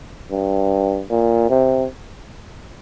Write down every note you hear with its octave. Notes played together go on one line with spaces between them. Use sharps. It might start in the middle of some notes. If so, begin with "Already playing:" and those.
G2
A#2
C3